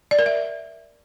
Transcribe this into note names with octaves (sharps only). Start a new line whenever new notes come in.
D5
A#4
E5